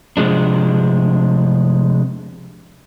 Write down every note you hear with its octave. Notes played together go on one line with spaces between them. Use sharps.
C3 F3 G#3 D4